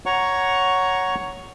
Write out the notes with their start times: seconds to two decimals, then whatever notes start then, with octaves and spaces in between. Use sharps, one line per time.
0.06 C#5 F#5 A#5 C#6